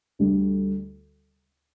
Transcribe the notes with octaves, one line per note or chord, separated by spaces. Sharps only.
D2 D3 G3